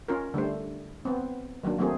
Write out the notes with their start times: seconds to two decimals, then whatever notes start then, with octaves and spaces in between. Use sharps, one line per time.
0.08 C#4 F4 A#4
0.34 D3 G3 A3 C5
1.05 B3 C4
1.63 D#3 F#3 A#3 D4
1.78 F#3 A3 A#3 C4 G#4